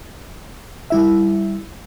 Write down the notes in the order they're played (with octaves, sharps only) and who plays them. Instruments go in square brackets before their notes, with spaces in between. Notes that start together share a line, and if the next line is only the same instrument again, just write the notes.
[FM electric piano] G3 E4 E5